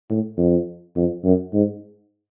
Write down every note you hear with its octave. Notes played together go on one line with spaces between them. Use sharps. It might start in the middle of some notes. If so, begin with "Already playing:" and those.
A2
F2
F2
F#2
G#2